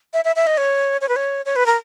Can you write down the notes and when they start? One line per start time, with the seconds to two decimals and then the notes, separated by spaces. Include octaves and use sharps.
0.13 E5
0.25 E5
0.36 E5
0.47 D#5
0.57 C#5
1.01 C#5
1.09 B4
1.16 C#5
1.46 C#5
1.56 B4
1.66 A#4